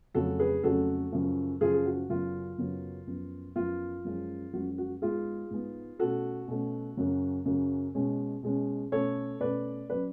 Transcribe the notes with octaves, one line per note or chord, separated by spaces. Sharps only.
F2 C#3 F#3 A3 C#4 F#4 A4
G#4 B4
F2 C#3 F#3 A3 C#4 F#4 A4
F#2 C#3 F3
F#2 C#3 F3 F4 G#4
G#4
F#4
F#2 C#3 F#3 B3 F4
F#2 C#3 F#3 B3
F#2 F3 B3
F#2 F3 B3 F4
F#2 F3 G#3 C#4
F#2 F3 G#3 C#4 F#4
F#4
G#2 G#3 B3 F4 G#4
G#2 G#3 B3
B2 A3 C#4 F#4 A4
B2 A3 C#4
F#2 C#3 F#3
F#2 C#3 F#3
B2 G#3 C#4
B2 G#3 C#4
B2 A3 C#4 A4 C#5
B2 A3 C#4 B4 D5
F#3 C#4 B4 D5